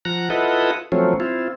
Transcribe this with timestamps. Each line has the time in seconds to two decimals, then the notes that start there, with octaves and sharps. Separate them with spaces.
0.05 F3 F#5 A#5
0.30 E4 F4 A4 B4 D#5 F#5
0.92 F3 F#3 A3 C4 C#4
1.20 C4 E4 F4